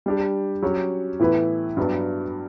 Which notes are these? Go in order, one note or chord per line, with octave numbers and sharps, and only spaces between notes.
G3 D4 G4
F#3 C#4 G4 C#5
A2 E3 B3 E4 B4
G2 F#3 B3 D4